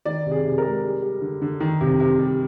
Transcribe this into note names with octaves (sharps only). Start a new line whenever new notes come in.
D#3 D5
C3
G#4
C3
A#4
G#3
G3
G3
D3
D3
D#3
C3
C3
G3